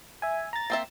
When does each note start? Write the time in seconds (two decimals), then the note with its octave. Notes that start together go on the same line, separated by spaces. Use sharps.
0.22 E5 G#5
0.53 A#5 A6
0.70 A#3 C4 E5